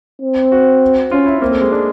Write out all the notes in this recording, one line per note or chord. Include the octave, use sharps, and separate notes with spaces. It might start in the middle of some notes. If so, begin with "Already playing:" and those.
C4
F#4
C#4 F4
E4
A#3 C4
A3
G#3
D4